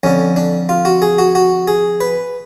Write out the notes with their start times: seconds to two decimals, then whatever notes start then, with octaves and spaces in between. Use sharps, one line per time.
0.03 F2 D3 C#4
0.36 D4
0.69 F4
0.85 F#4
1.02 G#4
1.18 F#4
1.35 F#4
1.68 G#4
2.01 B4